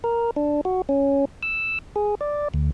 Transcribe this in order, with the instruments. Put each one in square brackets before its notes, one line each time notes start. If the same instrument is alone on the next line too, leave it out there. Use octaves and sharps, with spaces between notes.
[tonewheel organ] A#4
D4
F#4
C#4
E6
G#4
D5
D2